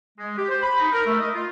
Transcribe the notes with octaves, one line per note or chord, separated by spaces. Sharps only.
G#3
G4
C5
B5
D#4
A#4
A3
D#5
F4